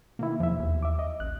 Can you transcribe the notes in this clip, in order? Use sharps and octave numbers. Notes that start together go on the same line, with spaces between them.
B2 D#3 A#3 E4
E2 F3 E5
D#2
E5 D6
D#5
A1 F#6